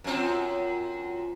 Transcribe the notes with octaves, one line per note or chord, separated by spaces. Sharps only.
F#2 C4 F4 A#5